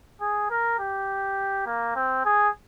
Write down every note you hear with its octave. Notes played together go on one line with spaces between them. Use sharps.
G#4
A#4
G4
A#3
C4
G#4